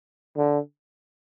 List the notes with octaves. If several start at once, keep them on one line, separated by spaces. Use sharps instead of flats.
D3